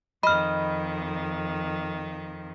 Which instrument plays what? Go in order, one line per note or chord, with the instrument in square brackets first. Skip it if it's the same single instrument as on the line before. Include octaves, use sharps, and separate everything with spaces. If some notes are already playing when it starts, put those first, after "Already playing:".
[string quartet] F2 D#3 [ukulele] D#5 [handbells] B5 F6